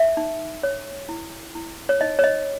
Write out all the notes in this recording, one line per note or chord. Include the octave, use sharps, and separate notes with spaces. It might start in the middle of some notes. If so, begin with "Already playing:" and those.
Already playing: E5
D#4
C#5
E4
E4
C#5
D#4 D#5
C#5
D#5